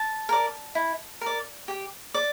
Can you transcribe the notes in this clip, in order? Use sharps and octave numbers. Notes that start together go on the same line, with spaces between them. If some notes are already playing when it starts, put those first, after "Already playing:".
Already playing: A5
A#4 D5
E4
A#4 D5
G4
D5